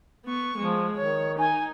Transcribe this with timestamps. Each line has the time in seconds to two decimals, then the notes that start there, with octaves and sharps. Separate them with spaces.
0.25 B3 C#6
0.58 F3 G#3
0.97 D#3 C#5
1.39 D#4 G#5